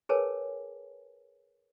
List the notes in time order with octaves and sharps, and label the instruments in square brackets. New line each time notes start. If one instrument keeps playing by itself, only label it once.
[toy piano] G#4 A#4 B4 C#5 G#5 A5